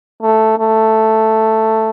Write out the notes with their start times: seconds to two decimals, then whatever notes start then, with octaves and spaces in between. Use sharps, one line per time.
0.22 A3
0.58 A3